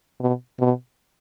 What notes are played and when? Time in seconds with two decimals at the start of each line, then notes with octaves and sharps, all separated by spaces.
0.20 B2
0.59 B2